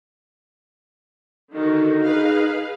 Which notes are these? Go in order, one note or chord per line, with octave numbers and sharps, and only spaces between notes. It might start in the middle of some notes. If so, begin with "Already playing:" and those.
D3 D#3 D#4 F#4
G#4 B4 F5